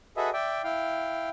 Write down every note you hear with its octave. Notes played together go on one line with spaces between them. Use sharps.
F#4 G#4 A4 B4 D#5 E5
D5 E5 G5
E4 F5 G5